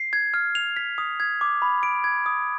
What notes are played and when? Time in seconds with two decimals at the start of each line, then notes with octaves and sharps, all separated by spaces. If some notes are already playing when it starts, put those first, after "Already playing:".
Already playing: C7
0.13 G#6
0.34 F6
0.55 F7
0.77 B6
0.98 D#6
1.20 G#6
1.41 D6
1.62 B5
1.83 D7
2.04 G#6
2.26 D#6